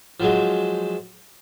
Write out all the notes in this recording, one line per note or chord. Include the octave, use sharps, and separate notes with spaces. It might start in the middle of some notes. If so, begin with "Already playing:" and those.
F3 F#3 G#3